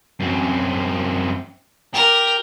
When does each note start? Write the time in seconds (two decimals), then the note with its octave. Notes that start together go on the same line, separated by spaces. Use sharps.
0.20 F#2 C4
1.94 G4 A#4